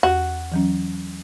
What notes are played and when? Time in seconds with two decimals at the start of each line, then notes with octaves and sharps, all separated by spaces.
0.03 E2 F#4
0.52 E3 F#3 C#4